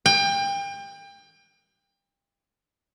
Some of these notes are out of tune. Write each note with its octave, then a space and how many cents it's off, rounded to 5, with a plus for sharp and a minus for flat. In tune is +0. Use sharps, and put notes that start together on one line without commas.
G5 +30